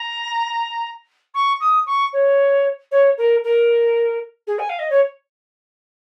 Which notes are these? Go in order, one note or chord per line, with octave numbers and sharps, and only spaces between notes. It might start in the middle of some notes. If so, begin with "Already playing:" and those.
Already playing: A#5
C#6
D#6
C#6
C#5
C#5
A#4
A#4
G#4
G#5
F5
D#5
C#5